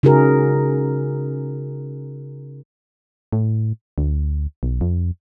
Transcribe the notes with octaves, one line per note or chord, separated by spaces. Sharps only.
C#3 D#4 F#4 G#4 A#4
A2
D2
B1
F2